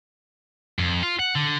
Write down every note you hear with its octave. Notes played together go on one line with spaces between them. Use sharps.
F2
F4
F#5
D3